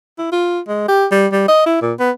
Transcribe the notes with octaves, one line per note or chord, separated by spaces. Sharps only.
E4
F4
G#3
G4
G3
G3
D#5
E4
A#2
B3